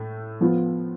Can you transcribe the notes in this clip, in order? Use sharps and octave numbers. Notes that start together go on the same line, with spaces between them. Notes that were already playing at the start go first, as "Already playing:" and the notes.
Already playing: A2 A3
F3 B3 F4